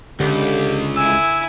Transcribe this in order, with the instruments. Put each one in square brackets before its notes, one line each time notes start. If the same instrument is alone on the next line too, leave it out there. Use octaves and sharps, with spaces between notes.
[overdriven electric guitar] C#2 [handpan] D3 [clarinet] G4
[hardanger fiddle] E4 G#5 [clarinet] E6